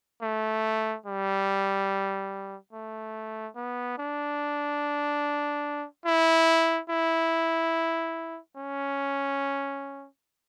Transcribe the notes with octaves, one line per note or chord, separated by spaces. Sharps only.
A3
G3
A3
B3
D4
E4
E4
C#4